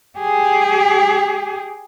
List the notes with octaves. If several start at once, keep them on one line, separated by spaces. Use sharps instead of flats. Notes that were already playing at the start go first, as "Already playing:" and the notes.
G4 G#4